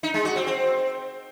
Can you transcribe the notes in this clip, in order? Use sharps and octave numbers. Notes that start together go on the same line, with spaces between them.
D#4
G#3
F#4
C4
C4